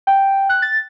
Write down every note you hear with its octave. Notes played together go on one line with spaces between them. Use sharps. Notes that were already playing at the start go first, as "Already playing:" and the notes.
G5
F#6
A6